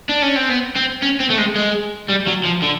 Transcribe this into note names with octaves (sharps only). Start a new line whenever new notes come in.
D4
C#4
C4
B3
C4
C#4
C4
A3
G#3
G#3
G3
F#3
F3
D3